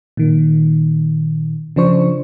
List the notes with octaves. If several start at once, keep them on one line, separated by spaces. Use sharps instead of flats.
A#2 D#3
C#3 F3 D4 C5 C#6